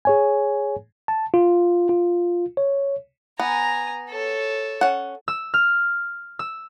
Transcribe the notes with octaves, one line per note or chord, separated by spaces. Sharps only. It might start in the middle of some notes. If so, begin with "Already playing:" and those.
G#4 C#5 G#5
A5
F4
F4
C#5
B3 G#5 A#5
A4 C#5
C#4 F#5
E6
F6
E6